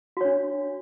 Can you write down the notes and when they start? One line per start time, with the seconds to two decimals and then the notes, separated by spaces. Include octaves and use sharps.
0.17 F#4
0.21 C#5
0.25 D4